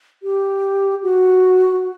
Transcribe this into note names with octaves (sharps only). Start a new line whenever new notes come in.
G4
F#4